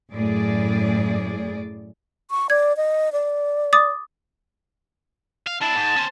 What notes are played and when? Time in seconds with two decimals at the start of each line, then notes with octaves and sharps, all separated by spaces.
0.13 F#2 A2 G#4 D5
2.31 C#6
2.50 D5 G#6
2.77 D#5
3.13 D5
3.73 D6 D#6 A6
5.47 F5
5.61 D4 E4 A5
5.75 G#2
5.96 C#4 C5